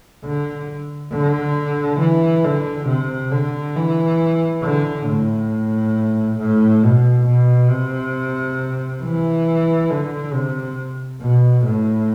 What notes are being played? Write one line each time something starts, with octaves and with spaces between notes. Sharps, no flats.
D3
D3
E3
D3
C3
D3
E3
D3
A2
A2
B2
B2
C3
E3
D3
C3
B2
A2